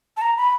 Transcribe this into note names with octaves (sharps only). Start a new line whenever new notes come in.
A5
A#5
B5